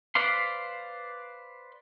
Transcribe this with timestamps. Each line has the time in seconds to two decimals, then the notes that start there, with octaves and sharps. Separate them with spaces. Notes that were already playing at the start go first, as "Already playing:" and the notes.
0.15 B4 C5 D5 F5 C6